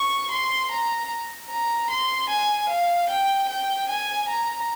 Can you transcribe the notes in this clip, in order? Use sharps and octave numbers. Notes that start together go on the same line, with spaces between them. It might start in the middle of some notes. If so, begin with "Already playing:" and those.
Already playing: C#6
C6
A#5
A#5
C6
G#5
F5
G5
G5
G#5
A#5